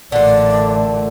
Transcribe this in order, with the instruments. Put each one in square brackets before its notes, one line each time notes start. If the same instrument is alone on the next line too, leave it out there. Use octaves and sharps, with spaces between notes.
[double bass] A1 A3 [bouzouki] A#2 D3 [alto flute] D5